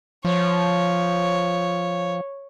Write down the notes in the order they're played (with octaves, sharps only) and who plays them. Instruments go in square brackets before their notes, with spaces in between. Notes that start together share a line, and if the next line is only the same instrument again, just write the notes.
[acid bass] F3 [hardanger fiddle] C#5